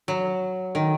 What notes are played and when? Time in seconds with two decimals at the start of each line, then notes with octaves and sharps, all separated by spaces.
0.08 F#3
0.75 D#3